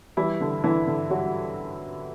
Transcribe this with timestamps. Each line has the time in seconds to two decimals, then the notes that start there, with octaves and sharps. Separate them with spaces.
0.17 E3 G3 E4
0.41 D3
0.64 D3 E3 E4
0.87 D3
1.10 F#3 G3 F#4